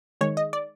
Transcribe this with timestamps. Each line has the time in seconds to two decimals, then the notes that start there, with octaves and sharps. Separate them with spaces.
0.21 D#3 G#3 C#5
0.37 D#5
0.53 D5